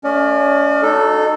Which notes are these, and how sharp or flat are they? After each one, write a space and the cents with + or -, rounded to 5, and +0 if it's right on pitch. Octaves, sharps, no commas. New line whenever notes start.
A3 +0 C#4 +30 D5 +45
D#4 -25 F#4 +0 A4 +0